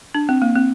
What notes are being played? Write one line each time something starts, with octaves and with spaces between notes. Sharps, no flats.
D4
C4
A#3
C4